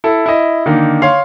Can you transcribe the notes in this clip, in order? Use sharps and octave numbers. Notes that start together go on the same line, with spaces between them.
E4 A4
E4 D#5
D3 D#3 A#3 D#4
C#5 F5 C6